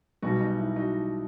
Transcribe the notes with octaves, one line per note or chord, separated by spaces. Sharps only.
B1 B2 G3 B3 D#4 F#4
D#4
E4
D#4 F#4